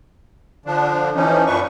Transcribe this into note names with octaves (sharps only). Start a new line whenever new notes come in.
D3 F3 D4
E3 F3 C#4 D#4
F#2 A#2 D4 B4 C#6